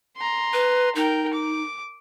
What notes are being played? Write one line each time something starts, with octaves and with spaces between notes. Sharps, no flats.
A#5 C6
B4
D#4 A#4 G5
D6